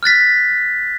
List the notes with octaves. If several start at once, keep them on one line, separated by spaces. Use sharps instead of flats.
F6 F#6 A6 B6